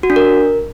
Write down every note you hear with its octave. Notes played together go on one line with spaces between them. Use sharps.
F#4
D4
A#4